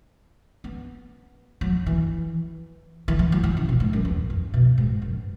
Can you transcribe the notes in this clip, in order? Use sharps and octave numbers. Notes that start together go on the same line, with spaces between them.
B3
F#3
E3
E3
E3
F#3
E3
C#3
B2
G#2
F#2
E2
F#2
B2
G#2
F#2